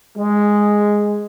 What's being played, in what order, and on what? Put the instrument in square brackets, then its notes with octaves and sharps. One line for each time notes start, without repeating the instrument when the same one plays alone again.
[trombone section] G#3